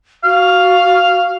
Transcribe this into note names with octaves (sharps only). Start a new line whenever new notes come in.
F#4 F5